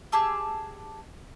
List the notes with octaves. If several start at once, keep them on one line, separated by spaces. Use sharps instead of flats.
G4 G#4 A5 E6